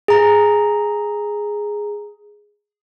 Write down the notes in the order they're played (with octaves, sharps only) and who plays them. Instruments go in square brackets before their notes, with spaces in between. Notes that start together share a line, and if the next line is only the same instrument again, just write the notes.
[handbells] G#4 A#5